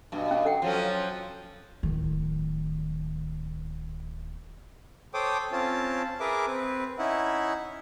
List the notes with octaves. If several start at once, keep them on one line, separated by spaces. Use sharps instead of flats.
G2 B2
C#4
A4 F#5 G5
F3 F#3 C#4
D1 D#3
A4 C5 C#5 G5 D6 D#6
C4 C#4 F4 A5
G#4 A#4 B4 E5 D6
C4 B4
C#4 D#4 E4 E5 F#5